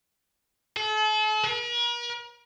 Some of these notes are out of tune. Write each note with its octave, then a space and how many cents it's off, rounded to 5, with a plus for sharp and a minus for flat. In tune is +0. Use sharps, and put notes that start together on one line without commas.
A4 -40
A#4 +45